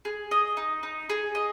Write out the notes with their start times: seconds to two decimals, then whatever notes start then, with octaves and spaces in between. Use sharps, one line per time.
0.05 G#4
0.31 D#5
0.57 D#4
0.83 D#4
1.09 G#4
1.35 D#5